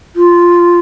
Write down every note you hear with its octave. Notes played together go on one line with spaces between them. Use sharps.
F4